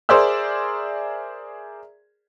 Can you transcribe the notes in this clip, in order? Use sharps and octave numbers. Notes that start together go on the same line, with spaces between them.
G#4 A#4 C5 D5 E5 E6